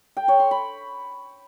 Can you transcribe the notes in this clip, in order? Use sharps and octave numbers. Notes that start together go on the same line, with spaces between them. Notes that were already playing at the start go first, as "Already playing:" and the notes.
G5
C#5
C6
B5